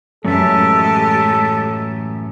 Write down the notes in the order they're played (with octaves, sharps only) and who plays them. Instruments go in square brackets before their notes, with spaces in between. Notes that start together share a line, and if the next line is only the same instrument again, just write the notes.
[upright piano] F#2 [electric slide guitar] A2 E3 E5 [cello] G#3 G4 [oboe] A4